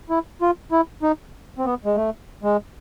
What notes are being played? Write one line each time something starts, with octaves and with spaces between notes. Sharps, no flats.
E4
F4
E4
D#4
C4
B3
G#3
A3
G#3